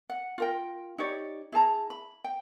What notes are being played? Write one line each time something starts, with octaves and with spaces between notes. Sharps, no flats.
F#5
F4 A#4 G5
D#4 G4 C#5 D5
E4 G#4 A5 A#5
B5
G5